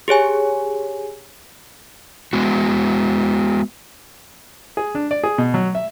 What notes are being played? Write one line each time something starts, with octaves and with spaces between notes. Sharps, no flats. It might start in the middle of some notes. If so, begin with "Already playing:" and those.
G4 G#4 C#5 G#5
G#3 B3 F#4
G#4
D4
D5
G#4
B2
F#3
E5